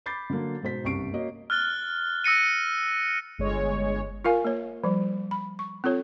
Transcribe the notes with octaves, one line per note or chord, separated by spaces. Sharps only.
B5 D6 G6 A6 C7
D3 F#3 A#3
G#2 B2 C5 B6
F#1 C2 G2 C#6 C7 D7
A#3 F#4 C#5 D#5
F6 F#6 A6 G7
E6 A#6 C#7 D#7
G1 G#3 C#5
F4 A#4 F5 G#5
A#3 C#5
F3 G3
B5
C#6
C4 F4 A4 C#5